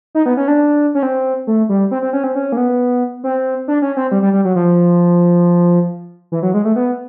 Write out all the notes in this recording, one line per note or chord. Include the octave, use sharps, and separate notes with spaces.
D#4
B3
C#4
D4
C#4
C4
A3
G3
C4
C4
C#4
C4
C#4
A#3
B3
C4
D4
C#4
C4
G3
G3
G3
F#3
F3
E3
F#3
G#3
A3
B3